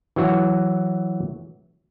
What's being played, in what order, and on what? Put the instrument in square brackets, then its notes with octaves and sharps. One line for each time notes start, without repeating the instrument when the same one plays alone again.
[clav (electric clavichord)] E3 F#3 F#4